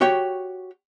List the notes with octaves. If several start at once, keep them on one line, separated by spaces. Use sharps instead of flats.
F#4 G4 C#5 G5